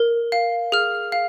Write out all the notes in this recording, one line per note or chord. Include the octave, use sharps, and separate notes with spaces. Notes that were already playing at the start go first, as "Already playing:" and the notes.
Already playing: A#4
F5
G#4 F6
F5